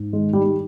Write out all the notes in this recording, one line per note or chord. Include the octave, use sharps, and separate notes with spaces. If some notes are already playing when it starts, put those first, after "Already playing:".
Already playing: G#2
D#3 G#3
G3
G3